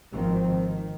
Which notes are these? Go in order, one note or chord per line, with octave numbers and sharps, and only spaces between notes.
G#1 D#3 F3 C4
D#3